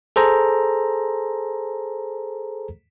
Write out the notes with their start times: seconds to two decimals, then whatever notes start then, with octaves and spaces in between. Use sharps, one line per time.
0.16 G#4 A4 C5 A#5